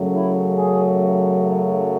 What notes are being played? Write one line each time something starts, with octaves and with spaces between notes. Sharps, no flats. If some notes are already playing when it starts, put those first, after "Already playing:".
Already playing: F#2 C#3 F#3 A3
E4
G#4